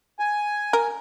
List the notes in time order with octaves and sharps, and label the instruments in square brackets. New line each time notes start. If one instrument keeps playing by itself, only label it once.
[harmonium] G#5
[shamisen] A#4